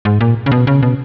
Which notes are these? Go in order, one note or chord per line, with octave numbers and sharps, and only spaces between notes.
G#2
A#2
C#3
B2
C#3
B2